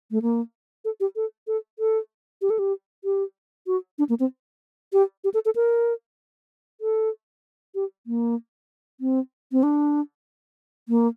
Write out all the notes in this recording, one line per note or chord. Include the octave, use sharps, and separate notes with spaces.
A3
A#3
A4
G4
A4
A4
A4
G4
A4
G4
G4
F#4
D4
A#3
C4
G4
G4
A4
A4
A#4
A4
G4
A#3
C4
C4
D4
A#3